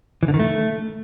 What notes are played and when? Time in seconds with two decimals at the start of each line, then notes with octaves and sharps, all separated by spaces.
0.23 E3
0.28 D3
0.34 D#3
0.39 A3